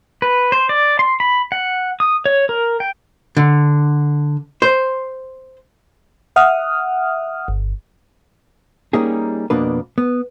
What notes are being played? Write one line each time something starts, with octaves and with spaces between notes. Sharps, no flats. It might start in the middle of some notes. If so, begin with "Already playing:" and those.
B4
C5
D5
C6
B5
F#5
D#6
C#5
A#4
G5
D3
C5
E5 F#5 D#6 F6
G1
G3 A#3 C#4 D#4 G4 G#4
F2 B2 A#3 D4 B4
B3